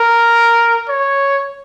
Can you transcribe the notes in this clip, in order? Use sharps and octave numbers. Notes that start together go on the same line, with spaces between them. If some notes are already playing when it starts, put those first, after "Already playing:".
Already playing: A#4
C#5